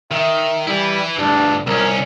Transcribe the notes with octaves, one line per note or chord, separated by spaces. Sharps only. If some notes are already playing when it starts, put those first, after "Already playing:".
D#3 E5
G3 E4 B4
D2 G2 D4
C2 C#4 A#4